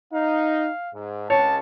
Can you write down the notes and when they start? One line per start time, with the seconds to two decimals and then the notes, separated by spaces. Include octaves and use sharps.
0.13 D#4 F5
0.93 G#2
1.30 C#2 C#5 A5